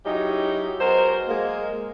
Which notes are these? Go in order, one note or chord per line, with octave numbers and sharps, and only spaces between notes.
F#3 G#3 C#4 D#4 E4 G4
F#3 G#3 B3 A#4 C5
G#3 A#3